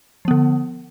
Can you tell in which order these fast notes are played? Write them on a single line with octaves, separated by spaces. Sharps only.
F3 B3 D3